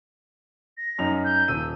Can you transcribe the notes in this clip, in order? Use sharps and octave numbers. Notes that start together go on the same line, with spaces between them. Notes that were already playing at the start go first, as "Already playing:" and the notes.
A#6
F#2 D#4 F7
G6
D#1 E6 D#7